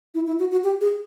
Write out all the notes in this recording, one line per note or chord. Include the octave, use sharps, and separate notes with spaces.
E4
E4
F#4
F#4
G4
G#4